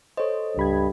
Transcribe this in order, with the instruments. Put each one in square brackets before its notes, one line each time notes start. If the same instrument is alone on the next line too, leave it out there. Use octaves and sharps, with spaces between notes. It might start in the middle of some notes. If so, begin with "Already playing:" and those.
[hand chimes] A4 D#5 [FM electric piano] C5 C#5
[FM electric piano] C#2 B5 G#6 [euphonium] G2